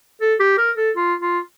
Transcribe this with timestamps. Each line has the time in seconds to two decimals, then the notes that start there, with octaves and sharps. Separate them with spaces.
0.21 A4
0.40 G4
0.58 A#4
0.77 A4
0.96 F4
1.21 F4